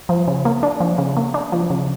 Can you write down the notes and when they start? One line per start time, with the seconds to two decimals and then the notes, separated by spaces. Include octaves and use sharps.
0.09 F3
0.28 C#3
0.45 A#3
0.63 D4
0.80 F3
0.98 C#3
1.17 A#3
1.34 D4
1.52 F3
1.70 C#3